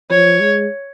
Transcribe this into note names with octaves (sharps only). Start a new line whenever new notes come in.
F3 C#5
G#3